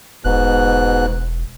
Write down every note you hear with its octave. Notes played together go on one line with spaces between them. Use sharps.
E1 G#2 B2 F#6